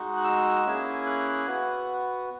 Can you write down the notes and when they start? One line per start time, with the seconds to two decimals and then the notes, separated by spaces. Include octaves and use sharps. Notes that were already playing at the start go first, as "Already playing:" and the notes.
Already playing: G#3 D#4 F#4
0.17 F#6
0.24 E6
0.65 A#3 C#4 E4 G#4
1.07 F#6
1.47 B3 F#4